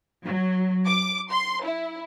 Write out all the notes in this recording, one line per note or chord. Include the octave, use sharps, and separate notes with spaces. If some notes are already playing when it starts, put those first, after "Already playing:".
F#3
D6
C6
E4